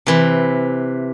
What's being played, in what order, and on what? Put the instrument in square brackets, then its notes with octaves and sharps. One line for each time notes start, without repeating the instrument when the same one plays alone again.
[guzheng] C3 E3